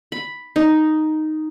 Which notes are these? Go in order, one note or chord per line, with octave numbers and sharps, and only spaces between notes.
B5
D#4